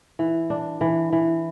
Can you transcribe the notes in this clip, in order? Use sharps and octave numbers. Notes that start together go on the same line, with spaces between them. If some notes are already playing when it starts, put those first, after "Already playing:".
E3
D4
E3
E3